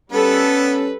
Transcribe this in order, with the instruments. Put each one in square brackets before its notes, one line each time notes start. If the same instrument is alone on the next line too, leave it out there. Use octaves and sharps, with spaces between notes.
[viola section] G3 A4 [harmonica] B3 [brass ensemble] C#4 [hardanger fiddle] B4